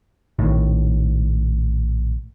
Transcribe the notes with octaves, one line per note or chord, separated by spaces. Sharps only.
A#1 A2 D#3